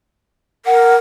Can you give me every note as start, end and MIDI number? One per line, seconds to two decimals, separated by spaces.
0.66 0.96 70
0.66 0.95 78